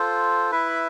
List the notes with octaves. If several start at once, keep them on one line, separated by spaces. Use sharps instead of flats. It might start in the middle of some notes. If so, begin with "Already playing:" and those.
Already playing: F4 A4 C5
E4 B4 E5